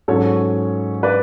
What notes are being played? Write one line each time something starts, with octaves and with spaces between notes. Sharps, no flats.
G#2 F#3 C#4 A4 C#5
B4 D5